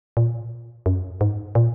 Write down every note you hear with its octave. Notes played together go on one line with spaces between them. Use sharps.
A#2
F#2
G#2
A#2